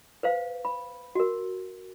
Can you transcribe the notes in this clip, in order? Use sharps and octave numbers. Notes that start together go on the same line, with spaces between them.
B4 C5 F5
B5
F#4 A#4